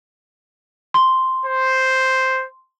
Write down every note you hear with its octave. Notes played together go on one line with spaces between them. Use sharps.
C6
C5